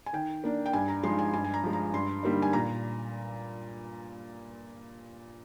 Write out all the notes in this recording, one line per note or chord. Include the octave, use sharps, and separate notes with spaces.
G#5
D#3 G5
A#3 D4
G5
G2 G#5
A#5
F3 G#3 D#4 C6
G#5
G2 G#5
G#5
A#5
F3 G#3
A#5
G2 C6
D3 G3 A#3 D#4
G#5
A#2 A#5